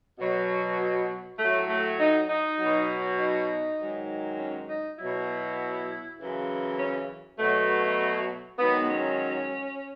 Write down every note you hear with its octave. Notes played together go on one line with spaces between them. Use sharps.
B2 F#3
A2 F#3 A3
A3
D#4
D#4
B2 F#3
D#4
G#2 D#3 F#3
C#4
D#4
B2 F#3 E4
F#2 C#3 E3
C#4
B2 F#3 A3
G#2 D#3 F#3 B3
C#4